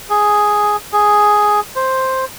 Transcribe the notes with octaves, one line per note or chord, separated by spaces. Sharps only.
G#4
G#4
C5